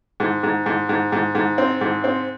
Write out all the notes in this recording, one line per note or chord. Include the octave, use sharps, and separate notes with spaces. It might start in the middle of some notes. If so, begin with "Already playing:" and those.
G#2
G#2
G#2
G#2
G#2
G#2
C4
G#2
C4